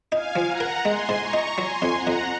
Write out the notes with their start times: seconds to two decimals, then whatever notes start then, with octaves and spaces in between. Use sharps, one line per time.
0.12 D#4 F5 G#5
0.36 F3
0.48 F#5 A#5
0.60 A#4
0.85 G#3 G#5 C6
1.09 G#2
1.21 A#5 C#6
1.33 D#4
1.57 F#3 G#5 C6
1.82 F2
1.94 F#5 A#5
2.07 F2